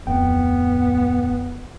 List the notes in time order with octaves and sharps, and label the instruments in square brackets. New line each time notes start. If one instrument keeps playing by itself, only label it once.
[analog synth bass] D1 [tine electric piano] F2 G5 [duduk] B3